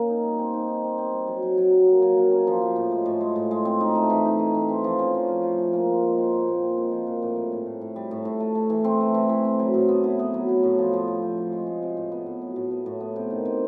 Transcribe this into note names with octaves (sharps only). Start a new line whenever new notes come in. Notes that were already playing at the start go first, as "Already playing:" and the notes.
Already playing: A#3 C#4
D#4
G3
C4
D#4
D#4
C4
C4
G3
F#3
F#3
F#3
F#3
A#3
F#3
A#3
C#4
F3
F3
A2
G#3
A2
G#3
A2
G#3
C4
D#4
A3
E3
D#4
A3
E3
C4
F3
C#4
F3
F4
F3
F3
A#3
F4
G#3
C4
A#2
A#2
C4
G#3
F3
A#2
A2
G3
A2
A2
A2
G3
A2
A2
A3
A3
E3
C4
A3
E3
E3
C4
F#3
A2
B3
E4
B3
F#3
F#3
A2
F3
F3
C3
F3
F3
G#3
G#3
C3
A2
B3
A2
F#3
A2
B3
A2
B3
C3
D#3
C3